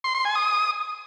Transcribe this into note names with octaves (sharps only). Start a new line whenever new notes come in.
C6
C6
G#5
D#6